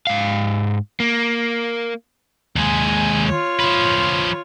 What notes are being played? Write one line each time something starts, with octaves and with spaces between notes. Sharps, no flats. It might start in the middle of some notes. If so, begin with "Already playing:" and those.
G#2 F5
A#3
D#2 G#3 G#5
F4 C#5
F3 B4